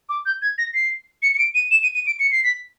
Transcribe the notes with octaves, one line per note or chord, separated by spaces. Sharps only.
D6
G6
G#6
A#6
C7
C#7
C#7
D7
D#7
E7
D#7
D#7
D7
C#7
C7
B6